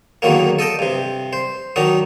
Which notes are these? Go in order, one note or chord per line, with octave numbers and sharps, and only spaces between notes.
E2 D3 D#3 F#3 A#3
A4 D#5 G5 A5
G2 C3
C5
D#3 F#3 D4 D#4